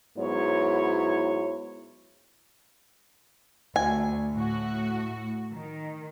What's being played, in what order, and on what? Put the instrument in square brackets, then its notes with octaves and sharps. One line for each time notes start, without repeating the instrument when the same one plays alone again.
[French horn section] G#2 F#3 B3 E4 C#5
[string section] D2 [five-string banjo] G#5
[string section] A2 F#4
D#3